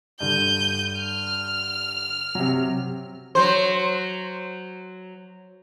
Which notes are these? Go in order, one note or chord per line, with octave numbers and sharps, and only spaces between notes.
G2 D3 G6 D#7
F6
C3 F#3
F#3 C5